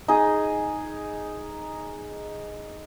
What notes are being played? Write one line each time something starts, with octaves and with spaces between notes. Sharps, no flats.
D#4 G#4